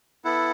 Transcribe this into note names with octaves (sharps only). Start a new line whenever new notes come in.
B3 E4 A4 F#5